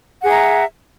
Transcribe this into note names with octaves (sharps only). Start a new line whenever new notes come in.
G#4 E5 F#5 A#5